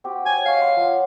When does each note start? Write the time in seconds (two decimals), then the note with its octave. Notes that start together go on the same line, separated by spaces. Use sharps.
0.04 C4 F#4 G4
0.26 C#5 G#5
0.46 D#5 F5 C#6
0.62 C#5 F#5 C6
0.76 F3 F#5